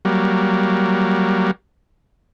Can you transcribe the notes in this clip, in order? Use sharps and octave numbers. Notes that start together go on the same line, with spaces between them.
F#3 G3 A#3